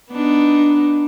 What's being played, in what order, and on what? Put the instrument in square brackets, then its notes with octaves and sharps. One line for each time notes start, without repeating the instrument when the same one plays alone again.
[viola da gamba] B3 D4 D#4